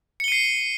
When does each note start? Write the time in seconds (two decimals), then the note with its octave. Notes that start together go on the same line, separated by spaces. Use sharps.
0.20 C#7
0.24 G7
0.28 D#7
0.32 C7